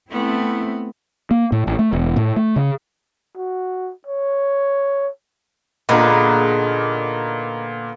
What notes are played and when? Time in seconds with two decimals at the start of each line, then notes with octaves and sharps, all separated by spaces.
0.11 A3 B3 C4 E4
1.31 A#3
1.52 A2
1.67 A1
1.79 A3
1.93 E1
2.16 A2
2.36 A3
2.56 C#3
3.37 F#4
4.07 C#5
5.89 A#2 D3 A#3 B3 D#4 G#4